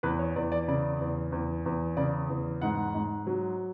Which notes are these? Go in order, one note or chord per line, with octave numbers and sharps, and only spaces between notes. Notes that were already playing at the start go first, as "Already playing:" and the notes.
E2 B4
C#5
E2 D5
D5
C#3 D5
E2
E2
E2
C#3 D5
E2
G#2 F#5
G#2
F#3